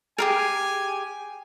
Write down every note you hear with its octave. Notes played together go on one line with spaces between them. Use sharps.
G4 G#4 A#4 G#5